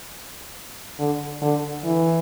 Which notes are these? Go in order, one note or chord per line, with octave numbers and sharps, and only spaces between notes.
D3
D3
E3